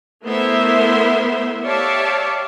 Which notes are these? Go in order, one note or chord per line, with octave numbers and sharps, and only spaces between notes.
A3 B3 E4 A#4 C5 E5
G4 C#5 D5 E5 F5 A5